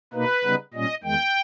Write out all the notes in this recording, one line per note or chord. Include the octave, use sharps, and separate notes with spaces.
B2 A#3 D#4 B4
C#3 G3 B3 D#4
A#2 G3 C#4 D#5
E2 D#3 G#3 G5